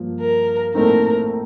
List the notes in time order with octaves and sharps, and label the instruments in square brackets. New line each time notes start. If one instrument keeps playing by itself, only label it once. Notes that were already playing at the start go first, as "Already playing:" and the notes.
Already playing: [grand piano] G2 F3 A#3
[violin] A#4
[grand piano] A#1 A2 A3 C4 D#4 [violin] A#4